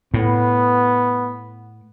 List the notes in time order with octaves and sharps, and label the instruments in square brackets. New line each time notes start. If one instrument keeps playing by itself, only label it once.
[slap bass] A2 [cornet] B3